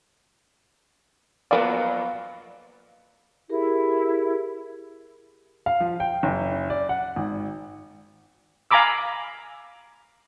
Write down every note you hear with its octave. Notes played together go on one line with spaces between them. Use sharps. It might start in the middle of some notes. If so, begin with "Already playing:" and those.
F2 F#3 A#3 B3 F4 F#4 D5 F5
E4 G4 G#4 A#4
F5
F3
G5
F#1
D5
F#5
G#1
F5 G#5 A#5 B5 D6 E6